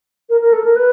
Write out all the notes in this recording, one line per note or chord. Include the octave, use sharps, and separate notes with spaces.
A#4
A#4
A4
A#4
B4